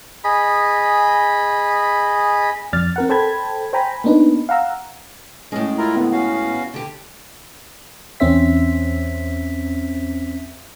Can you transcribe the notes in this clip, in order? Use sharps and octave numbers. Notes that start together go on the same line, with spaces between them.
G#4 D#5 B5
F2 D5 F6 A6
C4 A#4 F#5
A4 C5 G5 A5 B5 G#6
C5 G5 G#5 A#5 B5
A#3 B3 D4 D#4 B4
F5 F#5 A#5 E6
A2 G#3 C#4
E4 F4 A#4 A#5
D3 B3
C#4 F#4 F5
D3 G4
E2 C4 C#4 C5 E5 B6